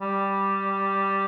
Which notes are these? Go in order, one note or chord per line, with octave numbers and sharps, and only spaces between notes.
G3